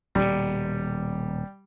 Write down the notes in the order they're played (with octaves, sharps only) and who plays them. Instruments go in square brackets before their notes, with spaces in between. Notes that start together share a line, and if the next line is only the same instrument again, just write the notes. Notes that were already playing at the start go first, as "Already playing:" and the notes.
[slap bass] D#1 B2 [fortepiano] G3